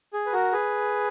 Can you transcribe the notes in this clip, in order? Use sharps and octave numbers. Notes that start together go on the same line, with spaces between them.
G#4
B4
F#4 A#4
G#4 B4